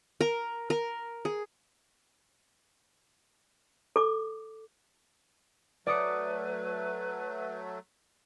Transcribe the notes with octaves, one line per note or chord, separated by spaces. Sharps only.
A#4
A#4
G#4
A4 D6
F#3 A3 B4 D5 D#6 C#7